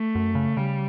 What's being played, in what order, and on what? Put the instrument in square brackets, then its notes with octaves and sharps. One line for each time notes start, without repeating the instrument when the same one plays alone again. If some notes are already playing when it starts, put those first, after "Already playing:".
Already playing: [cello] A3
[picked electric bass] F#2
C#3
[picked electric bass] C#3 [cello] G3